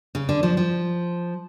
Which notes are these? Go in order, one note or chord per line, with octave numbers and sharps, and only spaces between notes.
C#3
D3
F3
F3